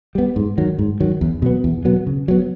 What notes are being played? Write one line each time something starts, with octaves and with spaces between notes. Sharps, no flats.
G3 B3
G#2
D#3 F#3
G#2
D#3 F#3
E2
B2 F#3 B3
E2
B2 F#3 B3
C#3
F#3 B3